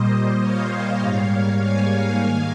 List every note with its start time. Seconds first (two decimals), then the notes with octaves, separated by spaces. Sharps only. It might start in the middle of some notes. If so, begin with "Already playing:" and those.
Already playing: A#2 G3 A#3 C5 D#5
0.40 C#5 F5
1.00 G#2 G3 A#3
1.61 F5 G#5
2.21 G#2 D#3 A#3